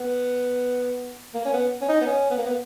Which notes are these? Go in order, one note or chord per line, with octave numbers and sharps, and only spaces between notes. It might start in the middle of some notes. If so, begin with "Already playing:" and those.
Already playing: B3
A#3
C#4
B3
C#4
D#4
B3
C#4
B3
A#3
B3